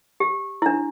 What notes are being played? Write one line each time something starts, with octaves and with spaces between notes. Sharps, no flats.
G4
E4
D4